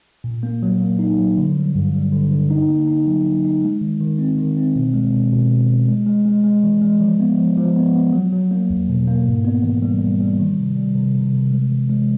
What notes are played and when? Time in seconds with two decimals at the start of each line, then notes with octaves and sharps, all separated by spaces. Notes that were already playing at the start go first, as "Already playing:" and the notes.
0.24 A#2
0.43 A#3
0.63 F#3
0.81 A#3
0.99 D#4
1.18 F#3
1.37 D3
1.57 G3
1.75 G2
1.94 G3
2.12 D3
2.31 D3
2.50 D#4
2.69 A#3
2.88 D#4
3.07 F#3
3.25 F#3
3.44 D#4
3.62 G#3
3.81 D#3
4.01 D#3
4.19 C4
4.38 D#3
4.56 C4
4.75 B2
4.94 G#3
5.13 B2
5.32 B2
5.51 B2
5.70 B2
5.88 G#3
6.06 G#3
6.26 G#3
6.44 G#3
6.64 E3
6.82 G#3
7.01 F3
7.20 B3
7.39 F3
7.57 F3
7.76 B3
7.95 B3
8.13 F#3
8.32 F#3
8.51 A#3
8.70 E2
8.89 B2
9.07 A#3
9.27 G#2
9.45 B3
9.63 E3
9.82 G3
10.01 G3
10.20 G3
10.39 D#3
10.58 C3
10.77 G3
10.95 C3
11.15 C3
11.33 C3
11.51 G#3
11.70 E3
11.90 G#3